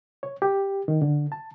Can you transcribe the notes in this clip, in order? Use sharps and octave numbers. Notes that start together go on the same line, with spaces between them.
C#5
G4
D#3
D3
A5